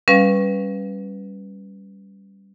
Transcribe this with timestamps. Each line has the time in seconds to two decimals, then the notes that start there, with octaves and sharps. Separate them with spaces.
0.08 G3 C#4 B4 F5